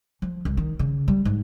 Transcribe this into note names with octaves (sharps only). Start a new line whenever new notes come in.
F3
C2
D#3
C#3
G3
G#2